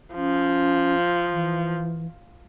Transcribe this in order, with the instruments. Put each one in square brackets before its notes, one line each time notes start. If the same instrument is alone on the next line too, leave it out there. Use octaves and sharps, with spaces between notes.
[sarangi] F3 [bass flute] C#4
[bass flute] E3